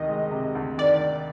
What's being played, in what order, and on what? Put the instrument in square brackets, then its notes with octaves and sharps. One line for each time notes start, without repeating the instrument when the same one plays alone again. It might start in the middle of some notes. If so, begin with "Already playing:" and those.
Already playing: [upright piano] D2 C3 D#3 [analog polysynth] D#5
[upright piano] G#3
C3
D2
[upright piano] D#3 [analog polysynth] D5